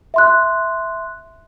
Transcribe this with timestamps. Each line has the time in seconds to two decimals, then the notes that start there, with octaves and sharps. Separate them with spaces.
0.14 E5 C6 F#6